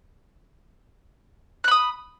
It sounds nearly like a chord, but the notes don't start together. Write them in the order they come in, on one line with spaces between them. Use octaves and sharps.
F#6 B5 D#6